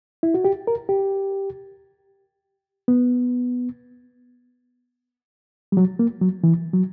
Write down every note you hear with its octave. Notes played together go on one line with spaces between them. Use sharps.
E4
F#4
G4
A#4
G4
B3
G3
F#3
A#3
F#3
E3
F#3